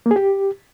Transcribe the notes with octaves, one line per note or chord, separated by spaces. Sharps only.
A#3
G#4
G4